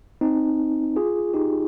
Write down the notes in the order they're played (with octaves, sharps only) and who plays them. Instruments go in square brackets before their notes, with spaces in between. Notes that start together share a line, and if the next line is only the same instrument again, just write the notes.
[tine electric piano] C4 D#4
F4 G#4
D#4 G4